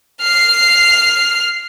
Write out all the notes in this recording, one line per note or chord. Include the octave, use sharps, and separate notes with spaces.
F6 C7